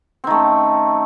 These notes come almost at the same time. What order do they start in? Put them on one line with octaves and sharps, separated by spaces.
C4 D#3 A3 C#4